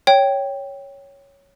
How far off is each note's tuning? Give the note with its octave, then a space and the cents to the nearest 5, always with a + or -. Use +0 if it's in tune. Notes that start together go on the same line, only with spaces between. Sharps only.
C#5 +0 G5 +0